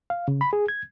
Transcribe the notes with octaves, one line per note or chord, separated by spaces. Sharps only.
F5
C#3
B5
G#4
G#6